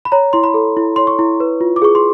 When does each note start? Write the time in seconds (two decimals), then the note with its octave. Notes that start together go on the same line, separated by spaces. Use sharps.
0.05 B5
0.12 C#5 A#5
0.33 E4 C6
0.44 B5
0.54 A4
0.77 E4
0.96 C#5 C6
1.07 C#6
1.19 E4
1.40 B4
1.61 F4
1.76 D6
1.82 G#4 C#6
1.95 C6